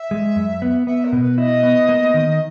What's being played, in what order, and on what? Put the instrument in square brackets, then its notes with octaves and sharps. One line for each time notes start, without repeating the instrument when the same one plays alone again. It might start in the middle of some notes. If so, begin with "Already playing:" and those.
Already playing: [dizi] E5
[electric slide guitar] G#3
F#2
B3
[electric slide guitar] B3 [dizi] E5
[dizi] A#4
[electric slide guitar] B2
[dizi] B4
[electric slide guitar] E4 [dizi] D#5
[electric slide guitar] B3
A#3
D#3
[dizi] D#5